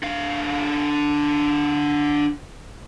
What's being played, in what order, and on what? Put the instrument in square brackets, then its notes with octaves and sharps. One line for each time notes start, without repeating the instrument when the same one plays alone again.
[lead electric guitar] D3 F5